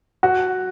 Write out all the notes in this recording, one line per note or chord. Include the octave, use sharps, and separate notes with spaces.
F#4